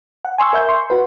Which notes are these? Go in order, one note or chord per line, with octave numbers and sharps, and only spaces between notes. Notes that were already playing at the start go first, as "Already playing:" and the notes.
F#5
G#5 C6 C#6 E6
A#4 E5 G6
C6 C#6
F#4 B4